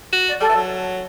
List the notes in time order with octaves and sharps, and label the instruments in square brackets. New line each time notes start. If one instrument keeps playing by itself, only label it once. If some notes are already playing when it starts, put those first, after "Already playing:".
[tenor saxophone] F#4
[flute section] D5
[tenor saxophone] G3 [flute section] A4
[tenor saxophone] E3
F#3